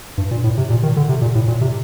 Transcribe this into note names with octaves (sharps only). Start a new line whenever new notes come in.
G2
A#2
A2
C3
A#2
D#3
D3
C3
A#2
A2
A#2
C3